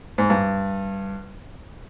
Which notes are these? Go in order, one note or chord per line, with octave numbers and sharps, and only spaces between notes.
G#2
G2